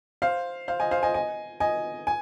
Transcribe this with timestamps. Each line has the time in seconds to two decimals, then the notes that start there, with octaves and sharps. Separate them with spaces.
0.22 C5 F5
0.68 C5 F5
0.80 D#5 G#5
0.91 C5 F5
1.03 D#5 G#5
1.14 D#5 G#5
1.60 D#5 G#5
2.07 G#5